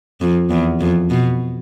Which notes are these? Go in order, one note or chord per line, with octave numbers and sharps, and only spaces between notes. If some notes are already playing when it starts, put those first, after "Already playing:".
F2
E2
F2
B2